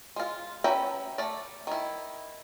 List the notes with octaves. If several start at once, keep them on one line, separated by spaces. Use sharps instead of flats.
G#3 F4
C#4 B4 E5 G5 A#5
A3 D5
D#3 E4